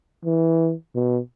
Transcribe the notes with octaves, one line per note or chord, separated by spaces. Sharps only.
E3
B2